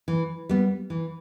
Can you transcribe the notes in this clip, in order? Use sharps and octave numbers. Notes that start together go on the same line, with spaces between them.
E3
G3 B3
E3